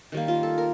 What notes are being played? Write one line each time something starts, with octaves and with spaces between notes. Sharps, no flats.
D#3 G3 A#3
F4
A4
A#4